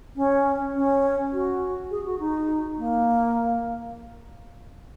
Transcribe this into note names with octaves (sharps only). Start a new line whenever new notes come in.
C#4
C#4
F#4
G#4
F#4
D#4
A#3